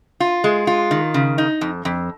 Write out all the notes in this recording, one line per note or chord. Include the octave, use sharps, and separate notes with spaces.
F4
G#3
F4
D#3
C#3
D#4
F2
F2